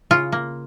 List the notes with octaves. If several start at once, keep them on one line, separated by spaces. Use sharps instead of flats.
C#3 F4
A#3